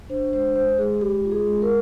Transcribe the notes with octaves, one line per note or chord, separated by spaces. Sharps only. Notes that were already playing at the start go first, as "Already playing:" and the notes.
D4 C5
G#3 C5
G#3 C5
G#3 G#4
G#3 G4
F4
G#4
G#3
A#4